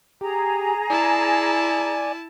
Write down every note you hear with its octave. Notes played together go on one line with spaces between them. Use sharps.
G4 G#4 A#5
E4 D5 G#5 A5